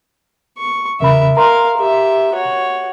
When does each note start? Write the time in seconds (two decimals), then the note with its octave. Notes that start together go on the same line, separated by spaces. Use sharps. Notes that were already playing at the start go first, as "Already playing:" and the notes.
0.58 C#6
1.00 E2 C#3 A#4 E5 B5
1.37 A#4 F5 A#5 C6
1.77 G4 E5
2.33 F#4 C#5